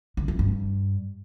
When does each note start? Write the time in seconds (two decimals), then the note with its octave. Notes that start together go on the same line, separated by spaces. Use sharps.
0.17 D3
0.28 E3
0.39 G2